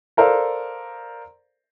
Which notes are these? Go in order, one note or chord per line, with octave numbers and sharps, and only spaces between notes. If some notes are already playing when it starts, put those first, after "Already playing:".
A4 A#4 C5 D5 F5